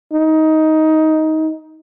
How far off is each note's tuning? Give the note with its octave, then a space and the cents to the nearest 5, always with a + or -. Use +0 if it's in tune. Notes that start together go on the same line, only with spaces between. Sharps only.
D#4 +15